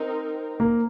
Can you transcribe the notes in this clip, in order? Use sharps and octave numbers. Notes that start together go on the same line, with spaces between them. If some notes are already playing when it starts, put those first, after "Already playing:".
Already playing: C4 D#4 A#4
A#3